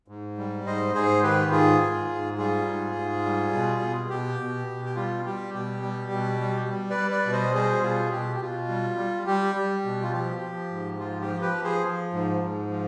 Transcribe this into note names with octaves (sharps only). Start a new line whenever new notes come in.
G#2
G3
G#2 C5 D#5
G#2 G#4 C5
D#3 G4 B4
G#2 F4 G#4
G#2
G#2
G3 F4 G#4
G#2
G#2
G3
B2
B2
B2 G4
B2
B2
G4
G3 F4
G3 G4
B2 G4
G3
B2
G3
G3
B4 D5
G3
B4 D5
B2
C5 D#5
G3 G#4 C5
B2 F4 G#4
B2 G4
G4
B2 F4
G3
G3
G3 G4
G3
B2
F4
F3 G4
F3
G#2
F3 F4
G4
F3
G4 B4
F3
G#4 C5
F3
G#2
G#2
F3